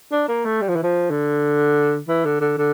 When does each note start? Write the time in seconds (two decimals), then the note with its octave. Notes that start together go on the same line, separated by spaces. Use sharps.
0.12 D4
0.29 A#3
0.45 A3
0.61 G3
0.69 F3
0.76 E3
0.83 F3
1.10 D3
2.08 E3
2.25 D3
2.41 D3
2.57 D3